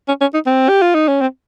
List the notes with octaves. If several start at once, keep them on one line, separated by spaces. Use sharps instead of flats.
C#4
C#4
D#4
C4
G4
F4
D#4
C#4
C4